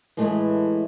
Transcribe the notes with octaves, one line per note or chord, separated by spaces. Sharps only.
A2 E3 G#3 A3